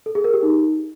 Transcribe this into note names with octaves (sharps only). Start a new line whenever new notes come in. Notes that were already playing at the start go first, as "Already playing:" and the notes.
A4
G#4
A#4
G4
D#4